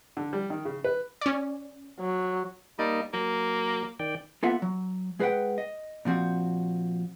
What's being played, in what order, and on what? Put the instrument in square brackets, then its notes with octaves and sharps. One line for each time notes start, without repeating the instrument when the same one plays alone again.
[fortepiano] D3
G3
D#3
C#3
B4
[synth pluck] C#4 D5
[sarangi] F#3
[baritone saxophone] G3 [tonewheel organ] A#3 D#4 D#5
[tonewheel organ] F#3 [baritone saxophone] A#3
[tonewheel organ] D#3 D5 G5
[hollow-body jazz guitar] A#3 B3 F4 A4 E5 F#5
F#3
G#3 G#4 B4 D#5 F#5 G5
D#5
A#2 F3 C4 F#4